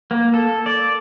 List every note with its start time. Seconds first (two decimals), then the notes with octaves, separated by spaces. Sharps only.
0.11 A#3
0.34 A4
0.66 D5